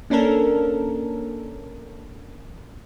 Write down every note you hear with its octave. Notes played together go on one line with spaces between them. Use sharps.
A#3 C#4 D4 A4 A#4